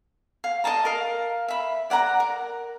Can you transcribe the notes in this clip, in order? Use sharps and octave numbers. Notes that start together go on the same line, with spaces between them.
F5
D#5 E5 A5 A#5
A#4 F5
E5 B5
D5 F#5 G#5 A#5
A#4